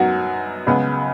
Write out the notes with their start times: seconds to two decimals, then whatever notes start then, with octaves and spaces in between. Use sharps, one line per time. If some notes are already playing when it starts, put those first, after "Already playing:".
Already playing: F#2 F#3 B3 D#4 F#4
0.66 C#2 C#3 B3